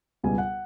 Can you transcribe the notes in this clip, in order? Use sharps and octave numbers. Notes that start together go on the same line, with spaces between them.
C#2 B2 G3 B3 G#5
F#5